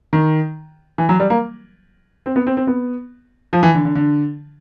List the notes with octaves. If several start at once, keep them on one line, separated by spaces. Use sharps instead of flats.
D#3
E3
F#3
G3
A#3
C4
B3
C4
C4
B3
F3
E3
D3
D3
D3